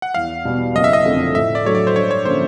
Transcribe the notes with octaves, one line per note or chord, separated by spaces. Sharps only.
F#5
E2 F5
B2 G3
F#1 D#5
E5
D#5
F2 D3 F3 A3
A2 E5
D5
F#3 A3 D4 C#5
D5
C5
G2 C#5
C#5
D3 F3 A#3 C#4 C5